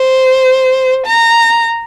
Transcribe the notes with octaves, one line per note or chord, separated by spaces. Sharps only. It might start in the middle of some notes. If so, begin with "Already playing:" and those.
Already playing: C5
A#5